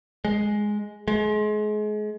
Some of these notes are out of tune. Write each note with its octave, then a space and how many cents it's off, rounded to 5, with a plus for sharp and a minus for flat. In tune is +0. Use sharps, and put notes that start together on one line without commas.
G#3 +5
G#3 +30